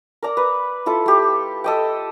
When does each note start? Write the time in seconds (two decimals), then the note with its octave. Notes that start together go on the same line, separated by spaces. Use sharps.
0.22 A#4 D5 A#5
0.37 B4
0.86 E4 F4 A4
1.06 A3 G4
1.64 A4 D#5 G5